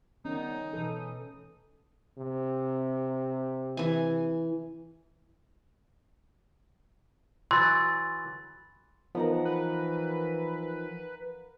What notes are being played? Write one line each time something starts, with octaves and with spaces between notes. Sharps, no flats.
D#3 G3 B3 C#4 D#4
B2 E3 A4 D#6
C3
E3 G#5
E3 F#3 C6 A6
E3 F3 B3 D#4 A#4 F5 F#5
B4